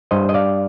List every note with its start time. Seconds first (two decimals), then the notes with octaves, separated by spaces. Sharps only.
0.11 G2 C5 D#5
0.29 D#5
0.34 D5 F5